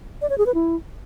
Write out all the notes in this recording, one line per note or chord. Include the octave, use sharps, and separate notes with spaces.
D5
C#5
G#4
B4
E4